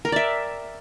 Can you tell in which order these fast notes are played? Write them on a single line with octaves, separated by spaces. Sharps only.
A#4 G5 D5 E5